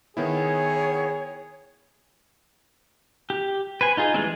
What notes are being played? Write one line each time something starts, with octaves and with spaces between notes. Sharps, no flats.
D#3 B3 E4 G#4 C#5
G4
B4 C5 G#5
D#4 F4 G#4
E3 G3 G#3 C4